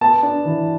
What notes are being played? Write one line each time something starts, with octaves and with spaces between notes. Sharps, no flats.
B3 A5
D4
E3